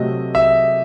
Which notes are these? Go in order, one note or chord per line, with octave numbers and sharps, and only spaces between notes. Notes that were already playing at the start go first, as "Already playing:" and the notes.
Already playing: C3 F#3 A3 D#5
E5